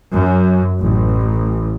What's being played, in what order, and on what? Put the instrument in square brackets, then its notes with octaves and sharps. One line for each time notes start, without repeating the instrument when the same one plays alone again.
[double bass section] F#2
A1